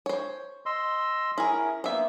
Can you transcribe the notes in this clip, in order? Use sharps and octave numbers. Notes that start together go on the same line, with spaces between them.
C5 C#5
D#5 C6 E6
C#4 E4 G#4 A#4
A#3 B3 C5 E5